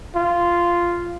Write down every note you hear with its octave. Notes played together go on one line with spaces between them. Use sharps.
F4